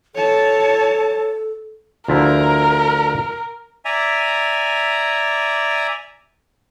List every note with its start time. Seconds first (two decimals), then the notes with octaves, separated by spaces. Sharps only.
0.15 A4 C#5 A5
2.08 D2 F3 E4 A#4
3.85 D5 E5 G#5 A#5